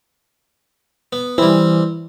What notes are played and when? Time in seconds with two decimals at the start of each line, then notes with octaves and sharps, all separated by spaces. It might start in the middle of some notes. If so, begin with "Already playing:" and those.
1.13 B3
1.38 E3 G3 C4